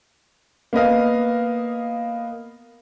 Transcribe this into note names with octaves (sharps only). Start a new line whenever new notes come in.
A#3 B3 D#5 F5